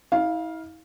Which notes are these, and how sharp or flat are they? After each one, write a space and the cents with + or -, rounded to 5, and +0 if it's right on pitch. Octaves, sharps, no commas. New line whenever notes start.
E4 -40 F5 +0